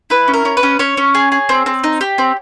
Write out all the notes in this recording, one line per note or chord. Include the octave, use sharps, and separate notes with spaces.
E4 B4
C#4
A#4
C#4
B4
C#4
C#4 C#5
C#4
G#4
G#4
C4
C4
D#4
G4
C4